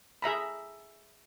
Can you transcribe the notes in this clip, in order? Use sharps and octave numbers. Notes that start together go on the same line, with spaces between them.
G#4 E5 A#5 B5